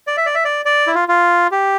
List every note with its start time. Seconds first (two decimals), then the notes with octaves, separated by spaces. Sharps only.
0.07 D5
0.17 E5
0.26 D5
0.35 E5
0.45 D5
0.65 D5
0.87 E4
0.95 F4
1.08 F4
1.51 G4